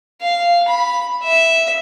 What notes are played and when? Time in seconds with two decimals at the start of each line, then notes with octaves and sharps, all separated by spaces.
0.21 F5
0.68 B5
1.23 E5